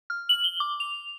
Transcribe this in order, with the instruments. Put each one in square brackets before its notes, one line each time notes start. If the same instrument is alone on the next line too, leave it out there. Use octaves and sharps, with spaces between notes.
[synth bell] F6
F#7
G7
D6
F7